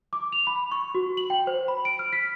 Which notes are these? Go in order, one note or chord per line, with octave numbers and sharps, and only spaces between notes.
D6
F7
B5
C#6
F#4
F#7
G5
C5
B5
D7
F6
B6